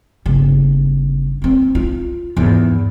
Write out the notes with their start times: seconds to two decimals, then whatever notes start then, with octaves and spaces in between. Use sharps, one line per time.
0.26 G1 C#3
1.42 A#3 C4
1.75 F4
2.36 E2 G#2